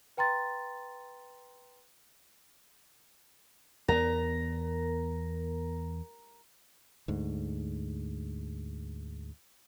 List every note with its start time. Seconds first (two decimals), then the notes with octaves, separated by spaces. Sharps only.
0.17 B4 G5 A#5 C6 A6
3.88 E2 B3 A#4 A#5
7.08 D2 G#2